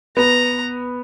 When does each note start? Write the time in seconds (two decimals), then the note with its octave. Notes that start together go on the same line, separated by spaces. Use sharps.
0.17 B3 A#5